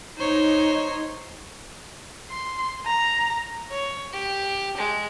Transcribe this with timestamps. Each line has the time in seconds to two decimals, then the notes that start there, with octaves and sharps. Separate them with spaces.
0.18 D#4 C5 C#5
2.31 C6
2.86 A#5
3.70 C#5
4.13 G4
4.77 G#3